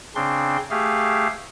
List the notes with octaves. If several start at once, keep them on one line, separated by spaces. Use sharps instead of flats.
C#3 C4 D4 C6
A3 G4 G#4 F5